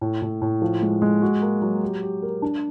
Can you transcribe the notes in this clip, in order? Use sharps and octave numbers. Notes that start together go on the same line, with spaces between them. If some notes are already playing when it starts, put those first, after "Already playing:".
A2
A2
A2
F3
G#3
G#3
F#4
A#3
F#3
G4
G4
A#4
D4